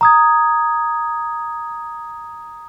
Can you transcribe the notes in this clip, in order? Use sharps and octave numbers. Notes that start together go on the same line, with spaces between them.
A#5 D#6 G#6